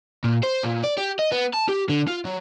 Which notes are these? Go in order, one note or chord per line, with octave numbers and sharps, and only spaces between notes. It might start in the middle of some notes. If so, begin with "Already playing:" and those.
A#2
C5
A#2
D5
G4
D#5
B3
A5
G4
D3
F4
F#3